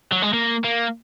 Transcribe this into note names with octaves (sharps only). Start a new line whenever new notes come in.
F#3
G#3
A#3
A#3